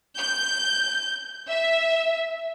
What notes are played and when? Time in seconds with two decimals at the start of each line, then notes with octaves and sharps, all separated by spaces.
0.18 G6
1.48 E5